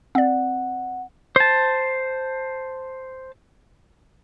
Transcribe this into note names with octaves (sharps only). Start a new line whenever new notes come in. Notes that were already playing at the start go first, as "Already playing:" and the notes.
C4 D5 F#5
C5 A5